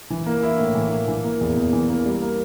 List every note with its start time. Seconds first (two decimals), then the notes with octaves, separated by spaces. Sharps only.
0.10 E3
0.26 A#3
0.43 E4
0.59 A2
0.75 E3
0.91 A#3
1.08 E3
1.24 A#3
1.41 E2
1.57 E2
1.73 E3
1.89 A#3
2.05 G3
2.22 A#3